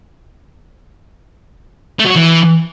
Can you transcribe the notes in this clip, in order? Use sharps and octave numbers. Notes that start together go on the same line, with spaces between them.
A3
F#3
F#4
E3